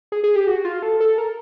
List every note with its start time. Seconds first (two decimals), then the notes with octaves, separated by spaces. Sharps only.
0.12 G#4
0.24 G#4
0.36 G4
0.47 F#4
0.65 F4
0.82 A4
1.00 A4
1.18 A#4